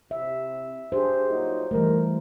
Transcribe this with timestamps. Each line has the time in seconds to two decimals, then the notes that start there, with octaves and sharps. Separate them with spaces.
0.11 C3 E5
0.92 D4 G4 G#4 C5
1.30 A#2 F#3 D#4
1.71 A#2 E3 G3 A3 A#4